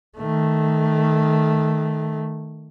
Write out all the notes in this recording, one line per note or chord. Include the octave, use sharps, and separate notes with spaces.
D#3 A3